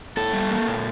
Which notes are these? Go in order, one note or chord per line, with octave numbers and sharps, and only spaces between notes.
A#2 A4
G3
A#3
A#2